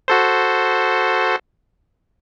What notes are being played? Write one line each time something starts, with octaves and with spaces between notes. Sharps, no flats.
F#4 A4 C5